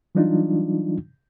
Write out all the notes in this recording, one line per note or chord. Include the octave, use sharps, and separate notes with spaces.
E3 F#3 G3 D4 D#4 F4